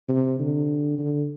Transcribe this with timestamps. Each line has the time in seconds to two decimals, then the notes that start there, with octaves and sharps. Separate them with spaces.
0.09 C3
0.39 D3
0.99 D3